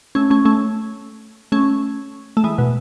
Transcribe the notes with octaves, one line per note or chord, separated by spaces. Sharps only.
A3 C#4
A3 C#4
A3 C#4
A3 C#4
A3
E3 G#3
B2